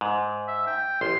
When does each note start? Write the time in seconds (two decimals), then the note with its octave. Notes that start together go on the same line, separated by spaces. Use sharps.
0.01 G#2
0.48 E5
0.67 G5
1.01 A1 C6